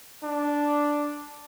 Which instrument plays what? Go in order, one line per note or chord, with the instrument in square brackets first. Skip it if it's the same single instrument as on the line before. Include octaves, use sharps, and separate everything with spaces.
[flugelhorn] D4